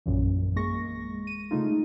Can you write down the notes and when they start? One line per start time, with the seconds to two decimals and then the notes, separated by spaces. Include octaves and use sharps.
0.06 A#1 F#2 A#2 E3
0.56 G#3 A#3 C#6 A#6
1.27 D#7
1.51 C#3 G#3 A3 D#4 F4